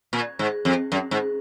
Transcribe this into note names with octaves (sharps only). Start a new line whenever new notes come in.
A#2
G#2
F2
F#2
G#2